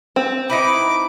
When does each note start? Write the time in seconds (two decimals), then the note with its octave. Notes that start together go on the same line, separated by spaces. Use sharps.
0.16 C4
0.50 D#4 E4 B4 D6